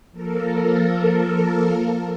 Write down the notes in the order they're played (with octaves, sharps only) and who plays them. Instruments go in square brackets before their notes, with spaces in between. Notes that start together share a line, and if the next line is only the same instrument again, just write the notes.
[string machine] F3 A#3 A4 A#4